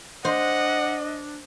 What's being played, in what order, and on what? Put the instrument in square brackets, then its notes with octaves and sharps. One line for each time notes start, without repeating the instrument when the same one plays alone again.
[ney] D4 [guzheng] C5 [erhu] D#5 [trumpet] F#5